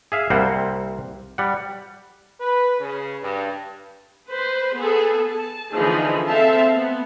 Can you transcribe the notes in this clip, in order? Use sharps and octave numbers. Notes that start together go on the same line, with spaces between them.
G#4 E5 F5
C2 G3 A#3 C4 C5 F#5
G3 F#5
B4
C#3
G2
B4 C5
B3 G#4 A4
A5
D3 E3 F3 D#4 G#4
C4 A4 E5 F5 A5
B3